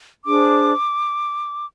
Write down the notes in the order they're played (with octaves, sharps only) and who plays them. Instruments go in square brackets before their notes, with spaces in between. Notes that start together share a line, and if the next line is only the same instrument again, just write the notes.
[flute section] D4 G#4 C5 D6